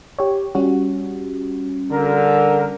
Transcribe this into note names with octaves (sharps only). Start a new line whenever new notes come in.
G4 C#5
G3 C#4 F#4
D3 A#4